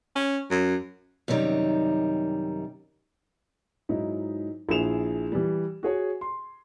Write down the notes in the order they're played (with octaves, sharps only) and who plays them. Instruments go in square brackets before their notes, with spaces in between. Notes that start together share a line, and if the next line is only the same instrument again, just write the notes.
[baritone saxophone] C#4
F#2
[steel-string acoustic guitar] F#2 C3 D#3 G3 D#4
[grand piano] G#2 F#3 D#4 E4
A#1 E4 G#4 E7 F7
E3 G3
F#4 G#4 C#5 G#5
C6